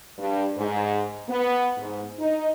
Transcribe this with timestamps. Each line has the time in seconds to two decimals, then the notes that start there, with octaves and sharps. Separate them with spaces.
0.18 G2
0.56 G#2
1.29 B3
1.78 G#2
2.19 D#4